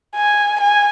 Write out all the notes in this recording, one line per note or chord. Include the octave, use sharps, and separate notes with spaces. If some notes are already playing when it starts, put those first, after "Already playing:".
G#5
G#5